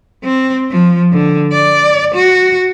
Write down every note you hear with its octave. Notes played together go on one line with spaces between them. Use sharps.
C4
F3
D3
D5
F#4